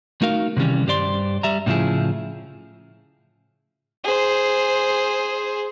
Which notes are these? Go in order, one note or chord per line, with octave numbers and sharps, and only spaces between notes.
A3 D#4 F#4 A#4 F5
C3 D#3 E3 G3 C#4
G2 G4 C5 D5 C6
G3 E5 A#5
A2 C#3 F3 E4 G#4
G#4 C5